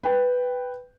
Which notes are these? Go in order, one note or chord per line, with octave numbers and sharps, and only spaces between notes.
B4 G5